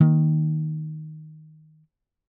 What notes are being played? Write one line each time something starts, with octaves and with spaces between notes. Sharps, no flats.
D#3 A#3